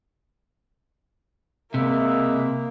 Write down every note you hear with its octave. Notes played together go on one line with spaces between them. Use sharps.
C3 G#3 A#3 B4 E5